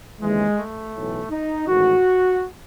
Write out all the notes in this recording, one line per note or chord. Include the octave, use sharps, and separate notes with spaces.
D#2 C#3 E3 G#3
A3
B1 A2 E3
D#4
A1 G#2 D#3 F#4